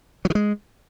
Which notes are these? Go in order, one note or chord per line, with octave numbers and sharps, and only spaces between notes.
F#3
D#3
G#3